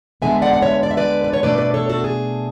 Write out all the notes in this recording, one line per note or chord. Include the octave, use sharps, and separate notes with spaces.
D2 D3 G#3 B3 E5 G#5
D5 F#5
F#5
C#5 E5
D5
E5
B4 D5
B4
C#5
B2 A3 D4 B4 D5
B4 D5
A4 C#5
F#4 A4
G#4